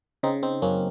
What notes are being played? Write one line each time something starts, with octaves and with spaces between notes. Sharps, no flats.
C#3 C4 D#4
C4 D#4
F#2 A#3 C#4